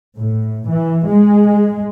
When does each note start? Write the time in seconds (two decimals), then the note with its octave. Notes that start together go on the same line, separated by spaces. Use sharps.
0.18 A2
0.69 E3
1.07 G#3